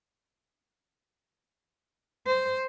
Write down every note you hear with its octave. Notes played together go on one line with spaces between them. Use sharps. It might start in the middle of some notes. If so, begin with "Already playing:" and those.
C5